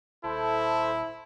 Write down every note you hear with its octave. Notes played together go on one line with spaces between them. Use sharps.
D#1 E4 A4 C5